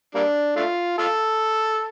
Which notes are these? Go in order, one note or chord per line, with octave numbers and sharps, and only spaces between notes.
G3 A#3 D4
A3 D4 F4
F4 A4